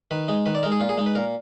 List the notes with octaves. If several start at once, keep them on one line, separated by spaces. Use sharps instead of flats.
D#3 B4
G#3 D#4
D#3 B4
D5
G#3 D#4 A#4
G#4
A#2 F4
G#4
G#3 D#4
B4
A#2 A#4